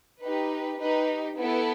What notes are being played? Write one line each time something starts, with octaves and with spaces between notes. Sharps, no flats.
D#4 G4 B4
D#4 G4 B4
B3 E4 A4